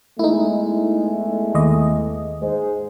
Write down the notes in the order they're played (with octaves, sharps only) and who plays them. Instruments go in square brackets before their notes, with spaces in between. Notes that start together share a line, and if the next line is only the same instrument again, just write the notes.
[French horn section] E2 G#3 A3 [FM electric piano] D#4 E4
[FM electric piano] D#2 D#5
[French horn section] G#2 G#3 C5